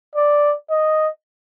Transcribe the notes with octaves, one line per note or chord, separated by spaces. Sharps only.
D5
D#5